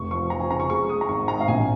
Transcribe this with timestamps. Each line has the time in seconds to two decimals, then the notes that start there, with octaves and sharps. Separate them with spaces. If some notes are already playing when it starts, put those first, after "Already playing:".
Already playing: F1 C#6
0.11 F3 C#6
0.30 F3 A#5
0.40 G#5
0.50 C#3 A#5
0.60 C#6
0.70 G#3 C#6
0.89 G#3 D#6
1.01 A#5
1.08 G#1 C#6
1.28 G#1 A#5
1.40 F5
1.48 A#1 G#5